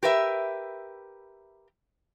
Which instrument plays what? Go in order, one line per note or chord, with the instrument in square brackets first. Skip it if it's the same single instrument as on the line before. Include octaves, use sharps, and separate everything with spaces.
[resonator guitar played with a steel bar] G4 A#4 B4 E5